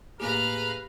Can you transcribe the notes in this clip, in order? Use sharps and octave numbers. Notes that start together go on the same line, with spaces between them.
A2 A#3 G4 G#4 B4 F5 A#5